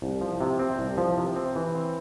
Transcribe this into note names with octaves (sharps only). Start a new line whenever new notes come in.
C2
F3
C3
C4
C2
F3
C3
C4
E3
C4